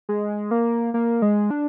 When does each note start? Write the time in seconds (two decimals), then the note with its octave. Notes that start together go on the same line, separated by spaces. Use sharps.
0.09 G#3
0.51 A#3
0.94 A#3
1.22 G#3
1.50 D4